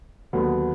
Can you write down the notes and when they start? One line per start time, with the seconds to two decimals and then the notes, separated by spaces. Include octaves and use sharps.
0.33 D#2 D3 F#3 B3